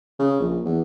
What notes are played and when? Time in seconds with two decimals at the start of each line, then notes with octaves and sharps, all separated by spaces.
0.19 C#3
0.40 A#1
0.65 E2